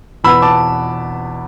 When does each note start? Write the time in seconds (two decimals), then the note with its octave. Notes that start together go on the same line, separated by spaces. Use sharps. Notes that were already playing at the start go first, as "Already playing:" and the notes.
0.24 E2 B2 B3 B5 E6
0.42 A5 D6